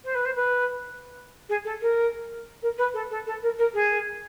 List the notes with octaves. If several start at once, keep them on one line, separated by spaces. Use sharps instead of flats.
C5
B4
C5
B4
G#4
A4
A#4
A#4
B4
A4
A4
A4
A#4
A#4
G#4